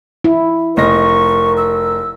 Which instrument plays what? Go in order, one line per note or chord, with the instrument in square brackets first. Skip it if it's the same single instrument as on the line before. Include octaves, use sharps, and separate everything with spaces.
[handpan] E4
[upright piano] F1 D#5 A#6 [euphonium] A#4 [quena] C#6
[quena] E6